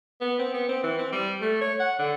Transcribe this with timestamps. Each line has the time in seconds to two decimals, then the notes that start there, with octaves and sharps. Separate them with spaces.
0.21 B3
0.39 C4
0.54 B3
0.69 C4
0.83 E3
0.98 C4
1.12 G3
1.41 A3
1.61 C#5
1.80 F#5
1.99 D3